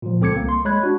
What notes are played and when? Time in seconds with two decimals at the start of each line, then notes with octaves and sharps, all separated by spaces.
0.02 A#2 F3
0.21 C#2 C4 A4 D6 G#6 C#7
0.35 C2 A#3
0.49 C6
0.65 G#3 C#5 B5 F#6 G#6
0.83 D4 F#4